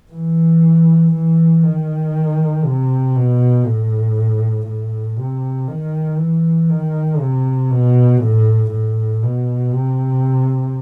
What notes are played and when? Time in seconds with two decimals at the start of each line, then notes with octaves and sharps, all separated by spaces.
0.12 E3
1.14 E3
1.63 D#3
2.65 C3
3.16 B2
3.66 A2
4.67 A2
5.18 C3
5.68 D#3
6.18 E3
6.69 D#3
7.20 C3
7.71 B2
8.21 A2
8.72 A2
9.23 B2
9.73 C3